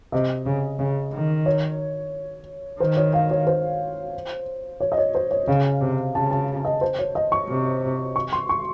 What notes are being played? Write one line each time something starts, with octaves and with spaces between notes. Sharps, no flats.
C3 D#5
C#3
C#3
D#3
C#5
D#3 C5
C#5
F5
C#5
C5
C#5
D#5
C#5
C5
C#5
C#3 F5
C3
C#3 A5
A5
D#5
C5
C#5
D#5
C#6
C3
C#6
C6
C#6